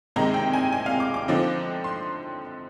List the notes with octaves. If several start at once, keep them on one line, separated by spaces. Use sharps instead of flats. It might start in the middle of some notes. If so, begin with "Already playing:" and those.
C3 D#3 G#3 D#4 A#5
G5
G#5
G#5
F5
D6
D6
D3 F3 C4 D#4
C6